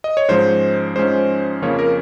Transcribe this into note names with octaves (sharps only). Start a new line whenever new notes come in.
D#5
C#5
G#2 F3 G#3 C#4 C5
G#2 F3 G#3 C#4 C5
F2 C#3 F3 A#3 C#4 C#5
A#4